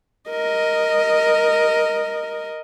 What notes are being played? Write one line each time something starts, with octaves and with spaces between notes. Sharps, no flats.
A#4 D#5